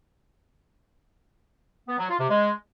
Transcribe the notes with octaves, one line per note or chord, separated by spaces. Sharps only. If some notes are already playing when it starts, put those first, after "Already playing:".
B3
F#3
F4
C3
G#3